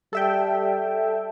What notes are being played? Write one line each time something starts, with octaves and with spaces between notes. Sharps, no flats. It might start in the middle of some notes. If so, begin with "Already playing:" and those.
G3 A4 E5 G5